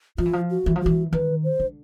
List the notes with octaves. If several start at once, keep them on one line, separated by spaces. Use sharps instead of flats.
F3 F4
E3
F3
F#4
E3
F3
E3 F#4
D#3 B4
C5
D3